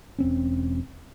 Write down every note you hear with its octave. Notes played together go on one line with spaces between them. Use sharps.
E1 C4 C#4